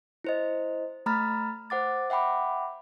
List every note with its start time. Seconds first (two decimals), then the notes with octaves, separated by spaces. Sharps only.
0.24 E4 C5 D#5
1.06 A3 A#5 B5 F6 A6
1.70 C5 F#5 D6 A6
2.10 E5 F#5 G5 B5 D6